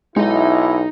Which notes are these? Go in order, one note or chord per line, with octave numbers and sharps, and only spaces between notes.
B1 G#3 D#4 E4 D#5